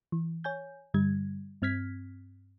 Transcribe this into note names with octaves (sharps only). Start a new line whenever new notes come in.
E3
C#5 G#5 G6
G2 D3 G3 G#6
G2 C4 F6 G#6 B6